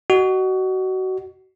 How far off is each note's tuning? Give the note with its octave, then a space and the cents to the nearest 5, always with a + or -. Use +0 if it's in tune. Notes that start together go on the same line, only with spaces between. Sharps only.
F#4 +25 D#5 -25